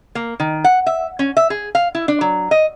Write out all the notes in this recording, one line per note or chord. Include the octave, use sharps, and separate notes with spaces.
A#3
D#3
F#5
E5
C#4
E5
G#4
F5
E4
D4
F#3
D#5